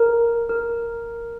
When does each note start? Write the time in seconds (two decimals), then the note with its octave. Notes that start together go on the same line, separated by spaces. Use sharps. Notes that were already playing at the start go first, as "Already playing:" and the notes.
Already playing: A#4
0.49 A#4